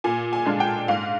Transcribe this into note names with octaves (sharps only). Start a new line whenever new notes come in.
A#2 G#5
G#5
G#3 D4 F4
G5
G#2 F5